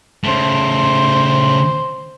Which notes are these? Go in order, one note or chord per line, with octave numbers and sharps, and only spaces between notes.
C#3 A3 C5